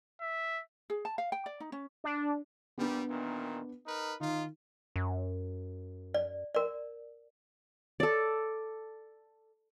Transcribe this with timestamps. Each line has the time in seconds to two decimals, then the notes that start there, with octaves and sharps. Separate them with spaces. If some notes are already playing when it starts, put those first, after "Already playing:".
0.21 E5
0.90 G#4
1.05 A5
1.18 F5
1.32 G5
1.46 D5
1.60 D#4
1.72 C#4
2.04 D4
2.78 A#2 G3 B3 D4
3.09 A#2 D#3 E3
3.86 D#4 A#4 B4
4.20 D#3 D#4 F4
4.96 F#2
6.14 D5
6.54 A#4 D5
8.00 A4 D5